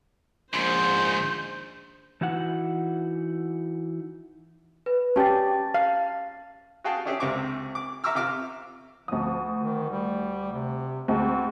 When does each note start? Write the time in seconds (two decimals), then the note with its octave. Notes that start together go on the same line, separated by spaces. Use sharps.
0.53 A#1 G#2 C#3 C5 C6 G6
2.21 E3 D#4 E4 F#4 F#5
4.86 B4
5.16 C#4 G4 A5 A6
5.74 F5
6.84 F#4 G#4 F5 G5 A5
7.05 C#4 D4 G4 G#4 E5
7.20 C#2 C3 C4 E5 C#6 D6
7.75 D6
8.04 E5 A#5 C#6 D6 E6 F6
8.15 C3 F4 D6 F6
9.08 D2 F3 D#6
9.61 D#3
9.90 G3
10.52 C3
11.08 D2 G#3 C4